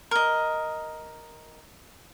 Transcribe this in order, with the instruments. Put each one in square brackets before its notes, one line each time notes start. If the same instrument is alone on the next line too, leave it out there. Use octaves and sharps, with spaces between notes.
[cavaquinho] A#4 D#5